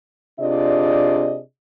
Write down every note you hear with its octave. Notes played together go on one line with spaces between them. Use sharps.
C3 D4 F4 G#4 D5 D#5